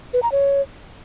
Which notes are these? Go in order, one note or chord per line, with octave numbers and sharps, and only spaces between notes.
B4
A#5
C#5